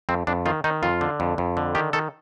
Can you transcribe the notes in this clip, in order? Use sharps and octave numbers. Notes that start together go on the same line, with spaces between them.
F2 C4
F2 D4
D#3 F4
D#3 D#4
F2 F4
D3
F2
F2
D3
D#3 G4
D#3 A4